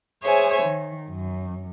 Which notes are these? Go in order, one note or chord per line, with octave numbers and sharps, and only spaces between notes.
G#4 C5 C#5 E5 G#5
D#3
F#2